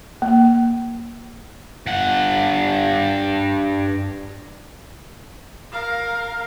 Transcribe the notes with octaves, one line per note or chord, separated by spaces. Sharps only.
A#3
G2 F#5
A#4 F5